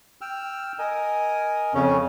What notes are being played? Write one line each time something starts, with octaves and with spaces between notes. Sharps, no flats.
G5 E6 F6
A#4 D#5 G#5
F2 C#3 C#4